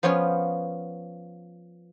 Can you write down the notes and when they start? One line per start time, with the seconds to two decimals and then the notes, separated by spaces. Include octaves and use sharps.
0.03 F3 B3 C#4 F4 C#5